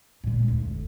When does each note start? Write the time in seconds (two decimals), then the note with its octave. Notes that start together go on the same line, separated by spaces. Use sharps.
0.24 A#2 G#3
0.48 F1 D2